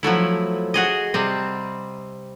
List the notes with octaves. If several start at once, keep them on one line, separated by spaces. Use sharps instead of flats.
F3 F#3 A3 E4
F#4 G#4 D#5
C3 G3 C4